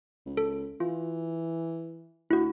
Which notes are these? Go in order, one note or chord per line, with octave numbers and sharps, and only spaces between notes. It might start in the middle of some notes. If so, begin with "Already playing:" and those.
C#2
A4
E3 F4
D2 E4 F#4